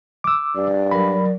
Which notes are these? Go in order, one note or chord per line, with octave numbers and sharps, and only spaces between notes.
D6 E6
G2 D5
F#3 A#4 B5